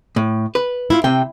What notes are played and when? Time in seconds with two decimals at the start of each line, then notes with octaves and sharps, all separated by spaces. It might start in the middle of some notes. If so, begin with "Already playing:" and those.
0.16 A2
0.55 B4
0.90 E4 F4
1.04 C3 G5